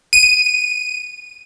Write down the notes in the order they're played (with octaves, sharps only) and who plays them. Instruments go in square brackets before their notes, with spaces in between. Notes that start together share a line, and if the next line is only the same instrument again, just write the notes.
[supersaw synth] D#7